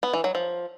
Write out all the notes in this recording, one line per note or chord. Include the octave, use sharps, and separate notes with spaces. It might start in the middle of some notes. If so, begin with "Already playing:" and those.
B3
E3
F#3
F3